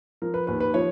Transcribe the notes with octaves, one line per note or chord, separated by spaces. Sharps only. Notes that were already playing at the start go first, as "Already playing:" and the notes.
F3 A#4
B4
D#2 B4
B4
F3 C#5